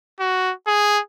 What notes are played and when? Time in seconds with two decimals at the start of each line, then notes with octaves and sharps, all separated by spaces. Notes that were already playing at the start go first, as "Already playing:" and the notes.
0.20 F#4
0.67 G#4